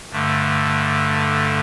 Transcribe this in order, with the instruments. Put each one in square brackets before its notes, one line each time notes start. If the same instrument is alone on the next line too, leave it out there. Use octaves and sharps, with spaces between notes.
[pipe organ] G2 D3 A3